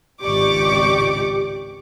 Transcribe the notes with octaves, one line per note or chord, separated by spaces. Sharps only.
G#1 C#2 G4 D5 C#6 D6